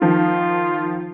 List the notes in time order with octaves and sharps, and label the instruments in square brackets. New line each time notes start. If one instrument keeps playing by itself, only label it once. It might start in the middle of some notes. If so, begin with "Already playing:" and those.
[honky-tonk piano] D#3 F3 [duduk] F4